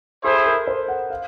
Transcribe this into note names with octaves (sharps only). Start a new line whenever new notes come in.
E4 G#4 A4 C5
A4
A#4
C5
F#5
F5